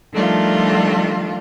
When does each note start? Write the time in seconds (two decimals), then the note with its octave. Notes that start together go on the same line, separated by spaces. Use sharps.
0.13 D#3 F3 G3 A3 D4 F4